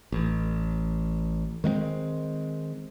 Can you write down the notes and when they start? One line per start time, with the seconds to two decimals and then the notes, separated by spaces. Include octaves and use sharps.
0.12 A1
1.64 D#3 G#3 B3 C4